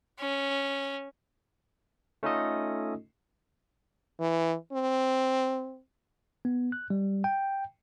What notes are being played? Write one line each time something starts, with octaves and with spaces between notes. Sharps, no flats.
C#4
A3 C#4 D#4 F4 A4 D#5
E3
C4
B3
F#6
G3
G5